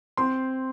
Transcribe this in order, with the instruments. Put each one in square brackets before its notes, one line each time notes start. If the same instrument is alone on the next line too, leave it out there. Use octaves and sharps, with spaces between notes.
[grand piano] C4 [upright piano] C6